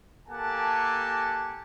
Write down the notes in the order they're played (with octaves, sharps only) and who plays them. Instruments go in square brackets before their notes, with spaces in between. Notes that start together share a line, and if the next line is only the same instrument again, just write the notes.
[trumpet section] A#3 G4 A4 F#5 G#5 A5